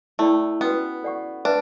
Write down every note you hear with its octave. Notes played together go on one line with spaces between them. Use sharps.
A3 E4 A4 D5 G5 B5
B3 C#4 F#4 B4
A4 D5 F#5 C#6
D4 B4 E5